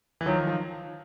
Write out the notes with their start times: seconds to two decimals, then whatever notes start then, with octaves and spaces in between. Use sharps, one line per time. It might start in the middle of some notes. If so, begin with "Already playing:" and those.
0.21 E3
0.26 D#3 F3 F#3
0.47 F3